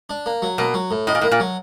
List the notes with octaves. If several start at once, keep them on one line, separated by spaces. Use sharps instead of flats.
D4
A#3
F#3
B2 A#3
F#3
A2
A2 D#4
A#2
A2 A#3
A#2
F#3